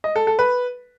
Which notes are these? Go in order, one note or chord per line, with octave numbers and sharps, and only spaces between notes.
D#5
A4
A4
B4